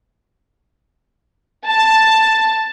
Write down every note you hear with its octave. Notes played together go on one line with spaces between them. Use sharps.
A5